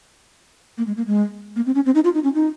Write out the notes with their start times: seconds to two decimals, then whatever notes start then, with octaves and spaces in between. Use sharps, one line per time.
0.78 A#3
0.87 G#3
0.97 A#3
1.07 G#3
1.56 A#3
1.66 C4
1.75 C#4
1.86 C4
1.95 D#4
2.04 F4
2.15 D#4
2.24 C#4
2.35 D#4